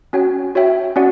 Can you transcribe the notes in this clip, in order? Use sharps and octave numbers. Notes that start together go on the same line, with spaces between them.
C#4 F#4 C#5 G5
F#4 C#5 E5 G5
C#4 F#4 D5 F#5